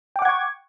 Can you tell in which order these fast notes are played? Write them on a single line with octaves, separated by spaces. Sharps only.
G5 D6 F#5 G#6 C#6